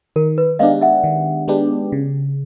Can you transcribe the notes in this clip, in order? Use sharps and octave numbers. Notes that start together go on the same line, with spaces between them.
D#3 A#4
B4
G#3 B3 D4 G4 D#5 F5
E5 F#5
D#3
G#3 B3 D4 G4
C#3